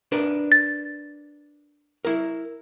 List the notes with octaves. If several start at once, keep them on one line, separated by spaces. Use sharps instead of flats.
D4 A#4 B4
A6
E4 A#4